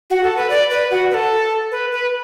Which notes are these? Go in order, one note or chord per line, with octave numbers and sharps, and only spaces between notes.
F#4
A4
B4
D5
B4
F#4
B4
A4
B4
B4